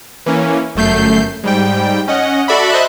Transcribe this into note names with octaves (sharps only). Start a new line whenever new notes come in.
E3 A#3 C#4
G1 F#2 A3 G6 C7
G#2 G3 G5
C#4 D#5 F#5
F#4 A4 D5 E5 B5
C5 D#5 E5 A5 B5 F#6